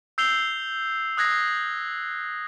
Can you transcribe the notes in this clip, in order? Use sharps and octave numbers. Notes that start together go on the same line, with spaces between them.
E6 G6 C7 F7 G7
D#6 F#6 G#6 A#6 C7